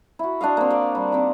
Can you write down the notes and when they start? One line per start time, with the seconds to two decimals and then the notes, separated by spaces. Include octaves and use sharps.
0.19 E4 F#4
0.41 D4 F#4 D#5 F5
0.57 A#3 C4
0.71 D5
0.95 G3
1.12 D#3 C4